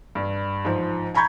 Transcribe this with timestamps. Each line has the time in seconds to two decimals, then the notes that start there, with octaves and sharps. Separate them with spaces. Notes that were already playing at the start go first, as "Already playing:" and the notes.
0.15 G2
0.65 G#2 F3
1.14 G#5 A#5 B5 C#6 G6 G#6